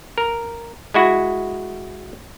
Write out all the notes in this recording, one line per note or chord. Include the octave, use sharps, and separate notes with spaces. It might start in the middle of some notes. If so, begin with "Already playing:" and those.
A#4
G#3 E4 F#4